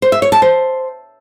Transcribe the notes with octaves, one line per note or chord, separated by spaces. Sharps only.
C5
E5
C#5
A5
C5